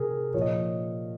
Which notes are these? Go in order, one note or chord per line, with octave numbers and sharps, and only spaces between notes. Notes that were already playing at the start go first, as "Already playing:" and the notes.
Already playing: C3 G#4 A#4
A#2 F3 C#5
D#5